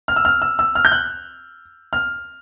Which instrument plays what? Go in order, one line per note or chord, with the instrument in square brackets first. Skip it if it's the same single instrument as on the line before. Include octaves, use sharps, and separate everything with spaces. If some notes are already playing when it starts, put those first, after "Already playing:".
[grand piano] F6
E6
F6
E6
E6
F6
G6
F#6
F6